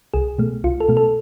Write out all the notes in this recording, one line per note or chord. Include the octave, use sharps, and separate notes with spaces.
C2 G#4
B2 A3
C2 F4
A4
B2 A3
A4